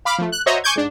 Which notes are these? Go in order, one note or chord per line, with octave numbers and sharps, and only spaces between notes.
F5 B5 D6 F6
F3 A3
F#6
F#4 C5 C#5 D#5 E5 A#5
G#5 C#6 D6 G6 G#6
G#2 D4